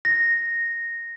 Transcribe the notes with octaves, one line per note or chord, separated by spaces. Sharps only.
A#6